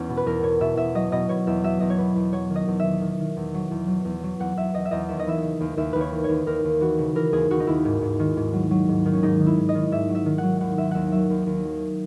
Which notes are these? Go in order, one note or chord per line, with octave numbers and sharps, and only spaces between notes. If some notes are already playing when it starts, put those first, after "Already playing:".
Already playing: E2 B3 C#4
B2
B4
E2 A#4
B2 C#5
B2 E5
E2 E5
F#3 D#5
B2 D#5
B2 C#5
E2 E5
F#3 E5
E2 D#5
C#5
B2 B4
E2
F#3 C#5
D#3
D#5
E2
E2 E5
D#3
D#3
E2
F#3
E2
F#3
E2
F#3
E2 F#5
E2 E5
E2 D#5
E5
E2 D#5
D#2 E5
D#5
E3 E5
C#3
D#2
D#2 E5
D#2 B4
C#5
E3
D#2 C#5
D#2 A#4
D#2
E3 F#4
C#3
E3 A#4
D#2 G#4
D#2 F#4
D#4
D#2 E4
G#2
G#2
D#3
G#2
F#3
F#3
G#2
D#3
C#4
G#2 D#4
D#3
E4
G#2
D#5
D#3
G#2 E5
F#3
E5
D#3
F#3 F#5
D#2 F#5
D#2 E5
D#2 E5 F#5
F#3 E5
D#2
D#2
F#3